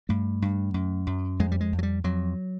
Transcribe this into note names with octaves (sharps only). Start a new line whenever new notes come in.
G2 A3
G2
F#2
F#2
F2 G#3
G3
G#3
F2
F#3
G3
F2 F#3